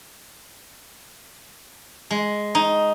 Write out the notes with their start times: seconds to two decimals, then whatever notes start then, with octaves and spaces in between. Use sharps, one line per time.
2.11 G#3
2.55 D#4